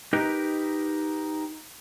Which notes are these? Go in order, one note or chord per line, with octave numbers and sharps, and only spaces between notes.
D#4 G4 A#4 B4 D#5